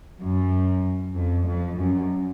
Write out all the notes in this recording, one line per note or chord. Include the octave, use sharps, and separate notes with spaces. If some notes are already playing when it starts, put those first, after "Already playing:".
F#2
F2
F2
F#2